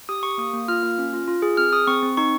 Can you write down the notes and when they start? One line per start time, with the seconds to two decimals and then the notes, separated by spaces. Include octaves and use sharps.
0.09 G4 D#6
0.23 G4 C#6
0.38 A#3 D#6
0.53 A#3
0.68 F4 F6
0.83 A#3
0.98 C#4
1.13 F4
1.28 F4
1.42 G#4
1.57 C4 F6
1.72 G#4 D#6
1.87 C4 C#6
2.03 C4
2.17 D#4 C#6